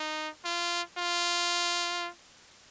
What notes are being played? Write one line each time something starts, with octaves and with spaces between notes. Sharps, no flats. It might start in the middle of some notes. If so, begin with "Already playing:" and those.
Already playing: D#4
F4
F4